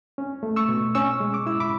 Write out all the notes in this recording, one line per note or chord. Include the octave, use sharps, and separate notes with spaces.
C#4
A3
C#6 E6
B2
C#4 C#6 E6
G#3
D6
E4 E6
B5 D6